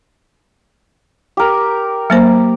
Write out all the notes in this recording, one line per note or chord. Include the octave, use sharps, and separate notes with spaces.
G4 A#4
F#3 A#3 C5